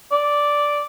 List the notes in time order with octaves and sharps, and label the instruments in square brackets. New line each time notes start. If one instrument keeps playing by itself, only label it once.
[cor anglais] D5